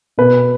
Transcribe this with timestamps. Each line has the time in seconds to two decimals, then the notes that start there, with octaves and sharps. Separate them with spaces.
0.18 B2 B4